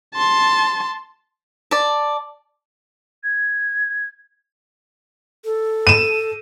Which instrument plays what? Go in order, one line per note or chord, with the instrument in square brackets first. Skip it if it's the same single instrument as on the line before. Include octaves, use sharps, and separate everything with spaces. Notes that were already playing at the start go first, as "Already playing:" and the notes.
[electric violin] A5 C6
[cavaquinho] D5 A5
[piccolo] G#6
[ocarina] A4
[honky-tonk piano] D#7 E7